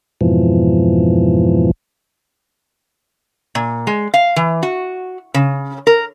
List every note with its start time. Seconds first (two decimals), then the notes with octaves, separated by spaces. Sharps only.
0.21 F2 G#2 B2 E3 F3
3.55 A#2
3.87 G#3
4.14 F5
4.36 E3
4.63 F#4
5.34 C#3
5.87 A#4